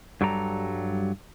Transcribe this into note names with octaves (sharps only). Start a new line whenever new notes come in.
G2 F#3 G3 A4 A#5